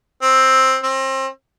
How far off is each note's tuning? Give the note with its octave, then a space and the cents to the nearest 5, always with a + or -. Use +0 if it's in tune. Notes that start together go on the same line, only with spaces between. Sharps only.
C4 +10
C4 +30